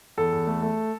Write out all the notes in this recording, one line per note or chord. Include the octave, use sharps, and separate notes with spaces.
E2 A4
E2
A3
A3